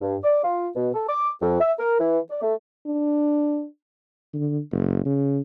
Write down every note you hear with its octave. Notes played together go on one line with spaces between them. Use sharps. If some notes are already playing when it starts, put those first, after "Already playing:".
G2
D5
F4
B2
A4
D6
F2
E5
A#4
E3
D5
A3
D4
D3
F#1
C#3